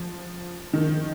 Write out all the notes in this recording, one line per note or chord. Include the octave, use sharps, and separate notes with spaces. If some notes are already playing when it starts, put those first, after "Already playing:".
Already playing: F3
D#3